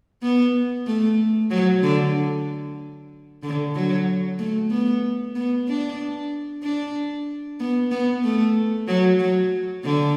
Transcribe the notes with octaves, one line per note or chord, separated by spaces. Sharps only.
B3
A3
F#3
D3
D3
F#3
A3
B3
B3
D4
D4
B3
B3
A3
F#3
F#3
D3